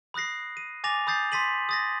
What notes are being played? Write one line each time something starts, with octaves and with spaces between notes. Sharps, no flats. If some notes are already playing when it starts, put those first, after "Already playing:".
B5 D#6 F#6 A#6 C7
D#7
G#5 D6 A6 A#6 F7
B5 D#6 G6 A6 C7
C6 A6 B6 D#7 F#7
D#6 A6 A#6